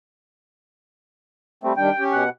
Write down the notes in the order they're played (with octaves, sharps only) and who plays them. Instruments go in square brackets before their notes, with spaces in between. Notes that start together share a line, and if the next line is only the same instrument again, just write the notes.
[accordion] G3 A3 C4
[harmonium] D#3 G3 D4 [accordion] G5
[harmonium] C#4 G4
[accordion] B2 F#5